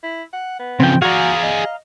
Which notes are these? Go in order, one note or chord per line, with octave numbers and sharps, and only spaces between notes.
E4
F#5
B3
C#3 F3 C4 G5
F#4 G#4 D5 F5 A#5
D#5